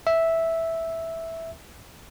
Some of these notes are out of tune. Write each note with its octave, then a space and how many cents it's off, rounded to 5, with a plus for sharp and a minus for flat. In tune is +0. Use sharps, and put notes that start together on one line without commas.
E5 -5